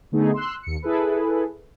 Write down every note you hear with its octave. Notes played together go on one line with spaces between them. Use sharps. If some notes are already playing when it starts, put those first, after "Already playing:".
D3 A3 B3 D#4 G#4
C6 E6 F#6
D#2 C#7
E4 G#4 A4 B4